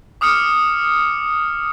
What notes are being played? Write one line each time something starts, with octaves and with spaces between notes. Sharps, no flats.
D6 D#6 F6 C#7